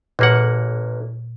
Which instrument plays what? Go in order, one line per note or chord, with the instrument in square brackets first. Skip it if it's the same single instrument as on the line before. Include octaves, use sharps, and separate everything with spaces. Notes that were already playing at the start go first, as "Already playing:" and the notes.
[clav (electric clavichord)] A1 A#3 F#5 [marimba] A#2